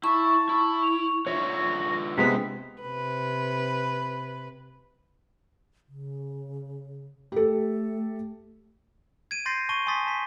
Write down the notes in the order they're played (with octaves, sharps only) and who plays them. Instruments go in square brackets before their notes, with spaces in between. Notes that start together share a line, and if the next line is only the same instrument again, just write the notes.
[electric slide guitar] E4 [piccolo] A5 [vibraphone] C#6
[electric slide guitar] E4
[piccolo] F7
[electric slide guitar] D3 F4 E5 [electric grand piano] C#5 [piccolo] A#6
[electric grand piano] C3 G#3 B3 [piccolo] B6
[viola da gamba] C3 B4
[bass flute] C#3
[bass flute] A3 [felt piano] G4 A4
[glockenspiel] G#6 D7 D#7
C6 G6 A6 A#6 C7
A5 C#6 D#7 G7
G#5 C6 C#6 D#6 A6 B6
A5 B6